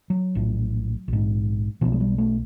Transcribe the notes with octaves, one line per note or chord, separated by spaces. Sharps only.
F#3
A#1 A2
A#1 G#2
B1 B2 F3
G#3
G3
A3